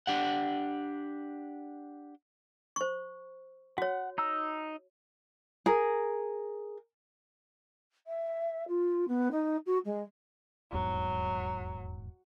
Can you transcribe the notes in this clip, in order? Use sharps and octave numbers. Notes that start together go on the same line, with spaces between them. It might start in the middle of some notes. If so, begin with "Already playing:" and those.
D4 G4 F#5
C5 C#6
F#4 C#5 F#5
D#4 A#5 E6
G#4 A#4
E5
F4
B3
D#4
F#4
G#3
D#1 E2 G#2 F#3